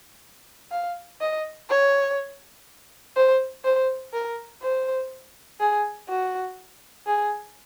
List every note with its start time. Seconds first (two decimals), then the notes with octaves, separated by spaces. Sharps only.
0.71 F5
1.21 D#5
1.69 C#5
3.16 C5
3.64 C5
4.13 A#4
4.62 C5
5.60 G#4
6.09 F#4
7.07 G#4